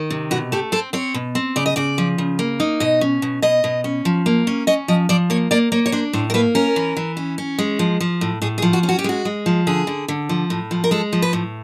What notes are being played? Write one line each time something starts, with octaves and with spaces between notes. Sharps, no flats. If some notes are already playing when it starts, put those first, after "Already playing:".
Already playing: D#3
C3
B2 F#4
A3 G4
C4 A4
C4 C#5
B2
C4
C#3 D5
D#5
C#3 D5
F3
C#3
A#3
D#4
B2 D#5
C#4
B2
B2 D#5
B2
C#4
F3
A#3
C#4
C#4 D#5
F3 D#5
F3 D5
A#3 C#5
A#3 D5
A#3 C#5
C#5
D4 C5
A2 C5
A#4
A#3 B4
C#4 A#4
E3
E3
C#4
C#4
G#3
F3
F3
A2
A2 G#4
G#4
F3
F#4
C#4
F#4
G4
G#3 F#4
G#3
F3
D3 G#4
D3
D3
F3
A2
F3
A#4
G#3 A4
F3
B4
A2